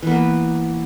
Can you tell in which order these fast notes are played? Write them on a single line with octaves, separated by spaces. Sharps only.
E3 B3 A#3